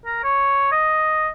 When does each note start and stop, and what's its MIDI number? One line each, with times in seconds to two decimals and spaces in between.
0.05 0.21 70
0.24 0.70 73
0.72 1.28 75